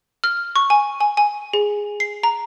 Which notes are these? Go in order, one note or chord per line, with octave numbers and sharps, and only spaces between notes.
F6
C#6
G#5
G#5
G#5
G#4
C7
A#5